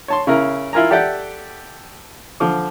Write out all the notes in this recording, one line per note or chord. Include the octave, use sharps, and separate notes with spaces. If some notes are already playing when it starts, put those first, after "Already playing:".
C#5 A5 C6
C#3 E4 A#4
E4 F4 A#4 G#5 A#5
G4 A4 D5 E5 F#5 G5
D3 F3 D6